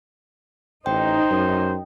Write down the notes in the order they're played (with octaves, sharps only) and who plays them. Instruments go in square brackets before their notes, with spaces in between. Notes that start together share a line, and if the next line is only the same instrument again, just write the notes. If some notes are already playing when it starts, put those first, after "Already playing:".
[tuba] A1 [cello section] D#4 [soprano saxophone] C5 [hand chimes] G5
[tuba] F#2